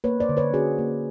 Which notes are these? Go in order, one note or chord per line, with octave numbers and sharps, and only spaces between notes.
A#3 B4 C#5
C5 D5
D3
B4 C#5
C#4 F#4 G#4
A#3